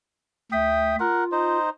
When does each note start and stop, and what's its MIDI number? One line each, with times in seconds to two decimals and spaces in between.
0.52 0.95 38
0.52 0.95 76
0.52 0.96 79
0.52 0.96 87
1.00 1.58 65
1.00 1.24 70
1.00 1.24 78
1.32 1.70 63
1.32 1.70 72